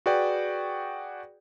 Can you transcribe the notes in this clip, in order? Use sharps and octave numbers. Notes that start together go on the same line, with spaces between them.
F#4 G#4 B4 D5 G5